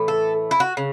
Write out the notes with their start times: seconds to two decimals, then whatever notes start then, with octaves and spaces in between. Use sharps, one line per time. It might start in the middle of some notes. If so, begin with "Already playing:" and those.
Already playing: A2 E3 A3
0.08 A4
0.51 E4
0.60 F#4
0.77 C#3